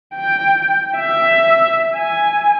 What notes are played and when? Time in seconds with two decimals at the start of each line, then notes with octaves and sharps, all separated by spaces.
0.15 G5
0.97 E5
1.95 G#5